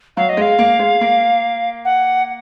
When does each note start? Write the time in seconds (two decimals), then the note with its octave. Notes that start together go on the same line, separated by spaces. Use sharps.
0.17 F#3 F5
0.29 D#5
0.37 G#3 F5
0.58 A#3
0.79 G#3
1.01 A#3
1.85 F#5